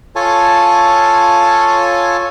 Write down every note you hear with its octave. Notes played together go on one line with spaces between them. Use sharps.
F4 A4 C#5 G#5 A5